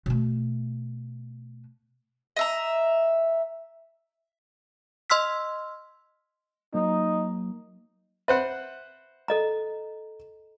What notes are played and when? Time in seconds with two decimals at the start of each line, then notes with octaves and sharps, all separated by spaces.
0.06 B2 A3
2.36 D#5 E5 A#5
5.10 D#5 C6 E6 F6 B6
6.74 F#3 A#3 D#4
8.28 B4 C5 E5 F#5
9.28 A4 D#5 A#5